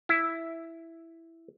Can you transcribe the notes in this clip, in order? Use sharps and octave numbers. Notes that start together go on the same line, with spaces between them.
E4